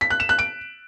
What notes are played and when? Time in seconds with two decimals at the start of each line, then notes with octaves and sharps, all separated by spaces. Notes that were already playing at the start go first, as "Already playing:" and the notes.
0.01 B6
0.10 F#6
0.20 E7
0.29 F#6
0.39 D7